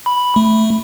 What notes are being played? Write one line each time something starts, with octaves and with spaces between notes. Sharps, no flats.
B5
A3